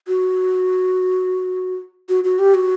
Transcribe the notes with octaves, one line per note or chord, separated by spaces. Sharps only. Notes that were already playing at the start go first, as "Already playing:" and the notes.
F#4
F#4
F#4
G4
F#4